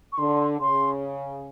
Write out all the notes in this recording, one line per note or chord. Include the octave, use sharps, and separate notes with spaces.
C#6
D3 C6
C#3 C6